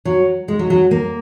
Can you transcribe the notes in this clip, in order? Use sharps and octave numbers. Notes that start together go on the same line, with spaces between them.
F#3
G#3
F#3
F#3
A#3